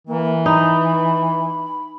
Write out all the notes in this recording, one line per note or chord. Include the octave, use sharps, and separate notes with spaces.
E3 A#3
D#4 B5